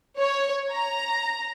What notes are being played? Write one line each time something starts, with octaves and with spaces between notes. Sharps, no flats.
C#5
A#5